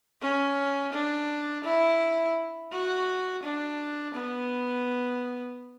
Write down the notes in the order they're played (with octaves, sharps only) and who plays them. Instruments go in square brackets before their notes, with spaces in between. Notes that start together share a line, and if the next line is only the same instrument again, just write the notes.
[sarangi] C#4
D4
E4
F#4
D4
B3